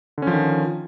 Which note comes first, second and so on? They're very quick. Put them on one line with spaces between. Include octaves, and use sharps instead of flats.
D3 C#4 F3 D#3